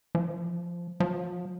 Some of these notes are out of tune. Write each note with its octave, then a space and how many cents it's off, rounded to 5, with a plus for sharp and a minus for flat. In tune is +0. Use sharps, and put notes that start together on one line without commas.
F3 -10
F3 +40